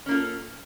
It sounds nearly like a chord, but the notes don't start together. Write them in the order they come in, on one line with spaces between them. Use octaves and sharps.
C#4 A#3 F4 A4